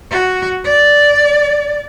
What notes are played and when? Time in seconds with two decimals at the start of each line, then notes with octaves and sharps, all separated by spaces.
0.11 F#4
0.65 D5